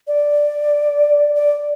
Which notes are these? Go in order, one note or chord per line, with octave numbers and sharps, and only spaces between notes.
D5
D5